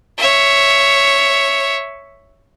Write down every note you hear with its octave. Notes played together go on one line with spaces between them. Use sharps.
C#5 E5